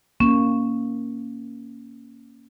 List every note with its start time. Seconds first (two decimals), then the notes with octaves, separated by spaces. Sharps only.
0.20 A#3 C#4